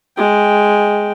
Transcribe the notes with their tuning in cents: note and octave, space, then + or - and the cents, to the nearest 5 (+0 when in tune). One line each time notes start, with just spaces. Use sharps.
G#3 +0 G5 +0